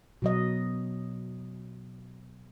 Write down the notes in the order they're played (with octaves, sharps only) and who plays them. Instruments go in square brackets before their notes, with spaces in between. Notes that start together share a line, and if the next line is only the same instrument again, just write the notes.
[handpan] B2 F#3 D#5